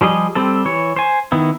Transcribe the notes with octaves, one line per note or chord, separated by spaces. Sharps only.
F3 G3 G#4 D#5
G3 C4 A4
E3 C#5
C5 G#5
D#3 B3 E4